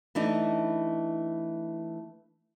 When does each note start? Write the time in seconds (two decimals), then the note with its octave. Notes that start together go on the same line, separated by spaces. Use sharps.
0.15 E3 A3 D4 D#4